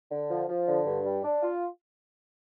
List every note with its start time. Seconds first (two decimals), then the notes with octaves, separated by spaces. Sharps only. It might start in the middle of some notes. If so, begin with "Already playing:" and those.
0.12 D3
0.30 F3
0.49 F3
0.68 D3
0.87 G2
1.05 G3
1.24 D4
1.42 F4